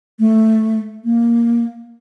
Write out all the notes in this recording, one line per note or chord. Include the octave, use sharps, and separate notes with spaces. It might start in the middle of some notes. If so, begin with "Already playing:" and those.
A3
A#3